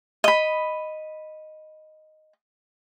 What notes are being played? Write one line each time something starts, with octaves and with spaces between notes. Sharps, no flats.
D#5 B5